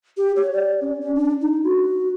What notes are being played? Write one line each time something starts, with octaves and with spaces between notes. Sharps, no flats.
G4
C#5
D5
C#4
C#4
D4
D#4
F#4